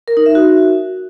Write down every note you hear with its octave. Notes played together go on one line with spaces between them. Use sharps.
A#4
D#4
E5
F#4